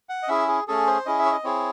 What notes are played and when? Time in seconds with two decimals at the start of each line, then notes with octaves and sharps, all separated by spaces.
0.09 F#5
0.23 D#5
0.28 C#4 E4 G#4 E5
0.48 G#4
0.68 A3 C#4 G#4 A4
0.87 C5
1.06 C#4 E4 G#4 D#5
1.19 E5
1.26 C#5
1.32 D#5
1.44 C4 E4 G#4 C#5